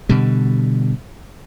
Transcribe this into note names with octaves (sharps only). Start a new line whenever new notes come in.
B2 D3 G3